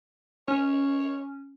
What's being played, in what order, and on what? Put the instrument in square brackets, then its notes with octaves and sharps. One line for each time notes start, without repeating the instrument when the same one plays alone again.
[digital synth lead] C#4 [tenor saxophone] C#5